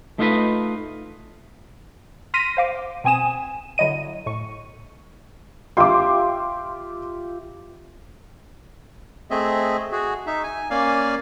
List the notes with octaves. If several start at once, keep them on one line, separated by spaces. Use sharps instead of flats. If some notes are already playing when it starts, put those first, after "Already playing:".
A3 D#4 F4 A4 B4 D#5
C6 F6 A#6 B6 D#7
C5 F5 D6
B2 C4 G#5 D#6 E7
D3 F#3 E4 D#5 D#7
A2 C#6
F4 G4 E5 C6 D6
A3 C4 G#4 D#5 E5
F#4 G#4
D#4 E5
G#5
A#3 C#4 D5 F5 G#5